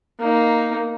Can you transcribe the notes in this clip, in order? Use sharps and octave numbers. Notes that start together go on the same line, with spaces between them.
A#3 D#4